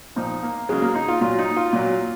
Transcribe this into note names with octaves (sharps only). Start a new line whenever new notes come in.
A#2 F3 D#4
A#3
C#3 F#3 G#3
A#3
D#4
F4
A#2 F#3 F4
D#4
F4
A#2 F#3